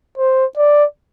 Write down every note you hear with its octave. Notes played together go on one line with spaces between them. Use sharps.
C5
D5